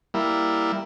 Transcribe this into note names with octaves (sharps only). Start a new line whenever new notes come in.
G3 A#3 E4